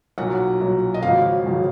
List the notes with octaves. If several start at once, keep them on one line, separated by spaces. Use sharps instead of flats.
B1 A#2 F#3 F#5
B1 A#2 F#3
D#5
G#1 F#2 C#3 F3 F5
G#1 F#2 C#3 F3